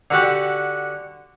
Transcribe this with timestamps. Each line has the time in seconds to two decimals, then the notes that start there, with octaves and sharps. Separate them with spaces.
0.11 D3 D4 F#4 G4